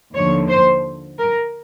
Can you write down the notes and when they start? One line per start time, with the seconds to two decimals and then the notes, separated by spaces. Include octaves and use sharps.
0.15 D#2 D3 F3 C#5
0.49 C5
1.19 A#4